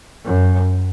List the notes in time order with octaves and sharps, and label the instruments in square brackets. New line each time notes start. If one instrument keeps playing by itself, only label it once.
[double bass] F#2